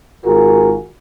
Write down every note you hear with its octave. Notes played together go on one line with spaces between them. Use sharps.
G#1 F4 F#4 G#4 A#4